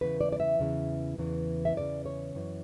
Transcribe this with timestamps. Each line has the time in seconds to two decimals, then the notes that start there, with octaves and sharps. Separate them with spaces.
0.01 E2 C#3 E3 B4
0.21 D5
0.32 D5
0.40 E5
0.59 E2 C#3 E3
1.18 E2 C#3 E3
1.65 E5
1.76 E2 C#3 E3 D5
2.06 C#5
2.35 F#2 E3